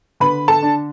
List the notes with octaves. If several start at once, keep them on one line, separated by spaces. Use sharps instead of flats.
D3 B4 B5
A4 A5
D4